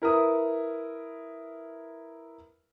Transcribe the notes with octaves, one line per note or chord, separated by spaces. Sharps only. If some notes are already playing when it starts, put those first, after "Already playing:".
E4 A#4 B4 D#6